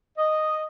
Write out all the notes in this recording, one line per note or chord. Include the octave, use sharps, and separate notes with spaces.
D#5